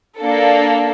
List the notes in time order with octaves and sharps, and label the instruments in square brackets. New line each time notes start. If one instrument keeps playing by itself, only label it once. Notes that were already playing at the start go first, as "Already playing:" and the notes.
[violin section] A#3 D4 A4